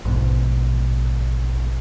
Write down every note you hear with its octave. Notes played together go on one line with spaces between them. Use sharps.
A#1 G#2 B2